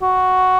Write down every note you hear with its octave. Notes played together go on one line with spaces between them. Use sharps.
F#4